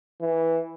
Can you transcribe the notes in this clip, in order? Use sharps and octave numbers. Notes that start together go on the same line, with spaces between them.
E3